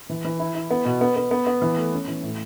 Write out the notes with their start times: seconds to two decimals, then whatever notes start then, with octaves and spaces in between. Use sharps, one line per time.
0.10 E3
0.25 E3
0.40 E4
0.55 E4
0.71 B3
0.85 B2
1.01 B3
1.16 B3
1.31 B3
1.47 B3
1.62 E3
1.77 A3
1.93 C#4
2.08 E3
2.23 A2